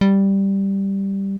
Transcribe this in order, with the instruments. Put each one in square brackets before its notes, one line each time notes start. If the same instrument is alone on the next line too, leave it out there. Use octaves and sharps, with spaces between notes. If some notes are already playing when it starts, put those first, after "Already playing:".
[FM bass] G3